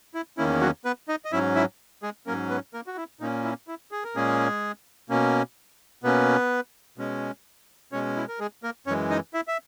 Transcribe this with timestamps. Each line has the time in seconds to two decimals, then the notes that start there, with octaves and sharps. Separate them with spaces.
0.14 E4
0.38 E2 D#3 A#3 C#4 E4
0.61 F#3 F#4
0.85 B3 B4
1.08 D#4 D#5
1.25 D#5
1.32 G#2 F#3 C#4 E4 E5
1.56 E4 E5
2.03 G#3 G#4
2.27 G#2 F#3 A#3 C#4 A#4
2.50 B3 B4
2.73 A#3 A#4
2.87 F#4
2.97 E4
3.20 A#2 A#3 C#4 D#4
3.44 E4
3.68 E4
3.91 G#4
4.04 A#4
4.15 A#2 G#3 A#3 C#4 G#4
5.09 B2 A#3 C#4
6.03 B2 A#3 B3 C#4 B4
6.97 B2 G#3 C#4
7.92 B2 G#3 C#4 C#5
8.16 E4
8.28 A#4
8.40 G#3 G#4
8.63 A#3 A#4
8.86 F#2 C#4 C#5
8.89 E3 G#3
9.10 D#4 D#5
9.34 E4 E5
9.48 E5